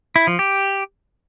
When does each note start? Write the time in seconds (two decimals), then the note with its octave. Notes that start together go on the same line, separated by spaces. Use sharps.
0.16 E4
0.27 F3
0.39 G4